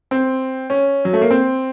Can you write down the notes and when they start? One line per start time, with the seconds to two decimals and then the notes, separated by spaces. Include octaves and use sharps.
0.11 C4
0.70 C#4
1.05 F#3
1.13 A3
1.21 A#3
1.31 C4